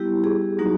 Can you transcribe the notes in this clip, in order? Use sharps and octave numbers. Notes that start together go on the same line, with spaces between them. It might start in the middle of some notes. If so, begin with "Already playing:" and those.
Already playing: G3 B3 E4 G4
G#4
F#3 A#3 D#4 F#4